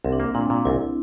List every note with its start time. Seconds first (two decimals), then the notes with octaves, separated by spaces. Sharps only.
0.05 C2 C4
0.12 D4
0.20 A#3 C4
0.35 A#2 D4
0.50 A#2
0.65 C2 E4